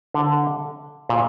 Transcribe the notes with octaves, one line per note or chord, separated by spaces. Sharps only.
D3
A#2